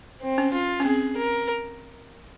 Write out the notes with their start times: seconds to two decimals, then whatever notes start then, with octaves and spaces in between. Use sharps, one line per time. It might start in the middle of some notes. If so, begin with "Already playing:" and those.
0.22 C4
0.38 C#4
0.54 F4
0.80 C#4
0.85 C4 G#4
1.17 A#4